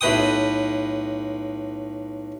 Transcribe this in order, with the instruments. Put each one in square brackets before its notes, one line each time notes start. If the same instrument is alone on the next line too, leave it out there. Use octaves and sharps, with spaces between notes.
[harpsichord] B1 A2 B4 G5 D#6